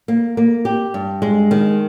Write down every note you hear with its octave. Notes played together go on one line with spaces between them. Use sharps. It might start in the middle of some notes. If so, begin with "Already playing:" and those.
A#3
A#3
G4
G2
G#3
D#3